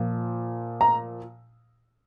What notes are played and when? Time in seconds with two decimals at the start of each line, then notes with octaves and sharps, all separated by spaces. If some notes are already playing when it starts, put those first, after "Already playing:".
Already playing: A#2 F3
0.81 A#5